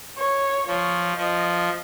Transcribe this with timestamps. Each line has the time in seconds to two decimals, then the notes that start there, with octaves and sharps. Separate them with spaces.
0.18 C#5
0.67 F3 C#5
1.17 F3 D#5